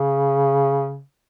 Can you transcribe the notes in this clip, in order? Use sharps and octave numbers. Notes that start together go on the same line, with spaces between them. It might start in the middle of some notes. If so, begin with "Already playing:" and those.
Already playing: C#3